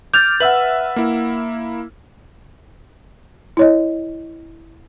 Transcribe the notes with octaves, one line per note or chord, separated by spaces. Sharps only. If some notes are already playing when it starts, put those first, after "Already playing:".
D6 F6 G6 A6 F7
B4 E5 F#5 E6 F#7
A#3 E4
E4 C#5 D#5